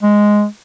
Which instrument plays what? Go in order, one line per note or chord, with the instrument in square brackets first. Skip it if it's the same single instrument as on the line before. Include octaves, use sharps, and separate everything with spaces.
[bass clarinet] G#3